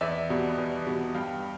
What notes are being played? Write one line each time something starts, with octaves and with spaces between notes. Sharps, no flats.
E2 D5 E5
B2 G3 B3
E2
B2 G3 B3
G2 F5 G5